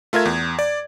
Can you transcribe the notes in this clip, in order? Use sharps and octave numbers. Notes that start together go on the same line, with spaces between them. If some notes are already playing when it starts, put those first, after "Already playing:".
A3 F4 A#4 E5 G#6
E2
D5